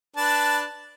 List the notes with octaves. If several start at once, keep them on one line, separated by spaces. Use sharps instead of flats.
D4 B4 A5